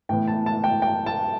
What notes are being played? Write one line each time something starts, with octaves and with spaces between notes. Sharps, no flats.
A2 E3 B3 G5
A5
A5
G5
G5
A5